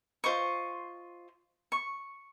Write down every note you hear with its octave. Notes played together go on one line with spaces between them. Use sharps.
F4 C5 D#5 C#6
C#6